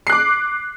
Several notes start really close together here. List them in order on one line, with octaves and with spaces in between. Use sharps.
C7 F#6 D6